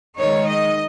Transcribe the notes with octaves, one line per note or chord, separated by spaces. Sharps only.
D#3 G#3 D#4 C#5
D#5